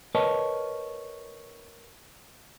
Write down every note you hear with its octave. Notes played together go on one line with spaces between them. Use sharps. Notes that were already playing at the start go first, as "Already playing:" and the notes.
A#4 B4 C#5 D#5 A5